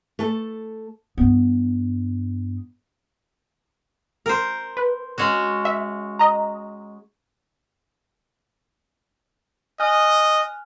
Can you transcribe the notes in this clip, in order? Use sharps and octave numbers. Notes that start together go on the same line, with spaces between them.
A3 A4
G2 B3
A#4 C5
B4
G#3 C#4 F#4
E5
D#5 A#5
D#5 G#5 F6 F#6